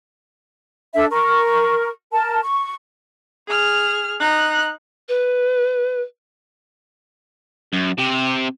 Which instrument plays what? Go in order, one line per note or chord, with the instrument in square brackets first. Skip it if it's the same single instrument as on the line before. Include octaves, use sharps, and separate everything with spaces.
[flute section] D4 A4 E5
A#4 C#6
A#4 A5
C#6
[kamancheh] G#4 F6
D#4 F#6
[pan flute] B4
[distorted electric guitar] F#2
C3 G4